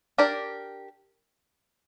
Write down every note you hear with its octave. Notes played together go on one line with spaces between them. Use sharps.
D4 G4 A#4 D5